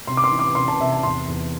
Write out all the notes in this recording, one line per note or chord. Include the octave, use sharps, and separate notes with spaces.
C3 C6
D6
C6
E3
D6
C3 C6
A5
C3 E5
A5
E2 C6
E2